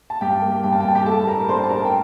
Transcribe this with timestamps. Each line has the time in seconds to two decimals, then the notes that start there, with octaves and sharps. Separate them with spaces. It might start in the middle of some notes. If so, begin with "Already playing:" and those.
0.10 A5
0.21 G2 G4 G5
0.42 A#3
0.63 G2 G5
0.72 A5
0.80 G5
0.85 G2 A5
0.95 G4 G5
1.06 A2 A4 A5
1.27 G3 A#4 A#5
1.49 D4 C5 C6
1.63 A5
1.69 D4 A#4 A#5
1.85 G5